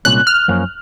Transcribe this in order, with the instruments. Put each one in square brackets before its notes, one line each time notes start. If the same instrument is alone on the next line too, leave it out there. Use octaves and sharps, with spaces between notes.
[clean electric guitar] C2 A#2 G#3 C#4 [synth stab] F#6
[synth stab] F6
[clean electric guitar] F#2 F3 A#3 C#4